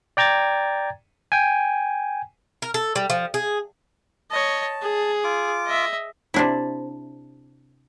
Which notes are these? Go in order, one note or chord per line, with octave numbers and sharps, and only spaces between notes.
D5 G5 A#5 G#6 A6
G5 G#5
A#4
A4
G3
F3
G#4
C#5 D#5 A5
G#4
F4 D6
D#5 E5
C3 D4 E4